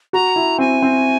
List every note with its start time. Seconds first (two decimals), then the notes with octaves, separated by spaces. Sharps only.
0.13 F#4 A#5
0.36 E4
0.58 C4 G#5
0.82 C4